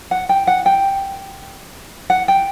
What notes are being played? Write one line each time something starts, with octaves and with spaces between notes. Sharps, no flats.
F#5
G5
F#5
G5
F#5
G5